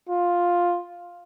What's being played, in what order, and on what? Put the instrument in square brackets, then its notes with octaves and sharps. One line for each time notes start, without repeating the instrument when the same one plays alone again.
[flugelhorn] F4